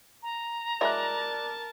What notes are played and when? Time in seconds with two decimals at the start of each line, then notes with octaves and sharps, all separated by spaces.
0.23 A#5
0.81 F#3 G#3 E4 A#4 D5 A5 D6 F#6